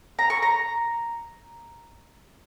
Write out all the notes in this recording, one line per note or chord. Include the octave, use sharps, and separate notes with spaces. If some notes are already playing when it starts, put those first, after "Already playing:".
A#5
C#6
A#5